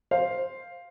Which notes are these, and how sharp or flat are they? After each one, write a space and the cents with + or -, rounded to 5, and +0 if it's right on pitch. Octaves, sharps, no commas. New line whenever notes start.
C5 +0 F5 +0